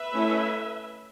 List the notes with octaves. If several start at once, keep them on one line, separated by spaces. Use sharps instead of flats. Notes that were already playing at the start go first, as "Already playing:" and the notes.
Already playing: B4 E5
A3 C#4 E4